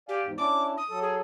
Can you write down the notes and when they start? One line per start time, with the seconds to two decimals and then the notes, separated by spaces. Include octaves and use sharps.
0.09 G4 D5 F5 G#5
0.23 E2 G#2
0.38 C#4 D4 E4 D6
0.77 D#6
0.90 F#3 A4
1.02 G#4